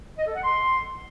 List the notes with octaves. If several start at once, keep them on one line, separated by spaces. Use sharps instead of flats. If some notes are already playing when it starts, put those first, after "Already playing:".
D#5
A4
F#5
C6